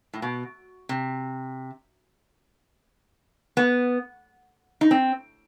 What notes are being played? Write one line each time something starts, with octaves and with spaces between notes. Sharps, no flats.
A2
B2
C3
B3
D#4
C4